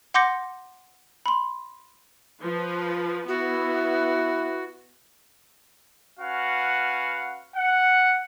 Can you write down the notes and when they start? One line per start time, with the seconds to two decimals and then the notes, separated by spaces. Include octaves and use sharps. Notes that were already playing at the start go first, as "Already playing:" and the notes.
0.14 F#5 C6 D6 G6 A#6 C#7
1.26 B5 C6
2.41 F3 B4
3.28 B3 E4 F#4
6.20 C#4 F#4 B4 F5 F#5
7.56 F#5